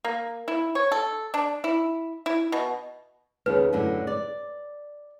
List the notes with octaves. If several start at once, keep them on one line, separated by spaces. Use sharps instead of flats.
A#3
E4
C#5
A4
D4
E4
E4
B2
D#2 C#3 B4
F#2 A2 D3
D5